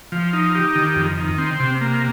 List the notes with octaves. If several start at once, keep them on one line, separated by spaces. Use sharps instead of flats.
F3
D#4
G4
D#3
F2
D#3
C4
C3
A#3